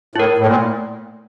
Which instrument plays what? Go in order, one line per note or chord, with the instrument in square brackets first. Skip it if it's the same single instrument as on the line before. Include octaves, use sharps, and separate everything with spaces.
[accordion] A2 [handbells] E4 A#4
[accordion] A2
[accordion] A#2 [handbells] A3